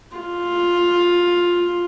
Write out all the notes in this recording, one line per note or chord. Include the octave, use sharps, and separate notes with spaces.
F4